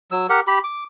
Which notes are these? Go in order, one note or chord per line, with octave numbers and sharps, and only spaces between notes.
F#3 E6
G4 A#4 F#5
G4 B5
D6